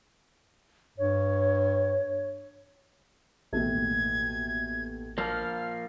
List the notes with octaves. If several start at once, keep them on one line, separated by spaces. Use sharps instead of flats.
G2 C#5
A1 D#2 B2 A3 G#6
F3 A#3 F6